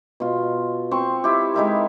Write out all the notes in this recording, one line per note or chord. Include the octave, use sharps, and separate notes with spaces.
B2 F4
C4 C6 C#6
E4 G4
G#3 D#4 E4 A#4